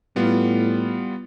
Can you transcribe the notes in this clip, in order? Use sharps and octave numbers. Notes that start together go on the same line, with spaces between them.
A2 G3 B3 F4